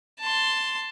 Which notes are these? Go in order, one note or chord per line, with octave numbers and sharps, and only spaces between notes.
A5 C6